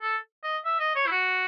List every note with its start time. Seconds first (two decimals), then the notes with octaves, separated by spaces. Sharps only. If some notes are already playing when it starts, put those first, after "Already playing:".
0.02 A4
0.43 D#5
0.65 E5
0.79 D#5
0.96 C#5
1.07 E4
1.11 F#4